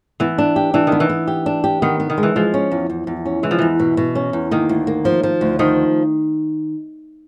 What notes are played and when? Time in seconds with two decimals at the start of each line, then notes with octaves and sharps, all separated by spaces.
0.20 E3 B3
0.38 D4
0.56 G4
0.74 E3 D4
0.87 D#3
0.92 B3
1.00 E3
1.09 B3
1.28 G4
1.46 D4
1.64 G4
1.82 D#3 B3
2.00 B3
2.10 D#3
2.18 G#3
2.23 E3
2.36 F3 G#3
2.54 C#4
2.72 E2
2.90 E2
3.07 E2
3.26 C#4
3.43 E3 G#3
3.51 F3
3.59 E2 E3
3.80 B2
3.97 B2
4.15 C#4
4.33 E2
4.51 D#3 A#3
4.69 D2
4.87 A#3
5.05 F3
5.23 F3
5.41 D2
5.59 D#3 F3